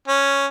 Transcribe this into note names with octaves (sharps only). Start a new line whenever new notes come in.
C#4